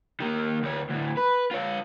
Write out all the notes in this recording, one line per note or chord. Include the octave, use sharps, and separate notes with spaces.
D#3 A#3
D2 C#5
D2 A2
B4
F4 C#5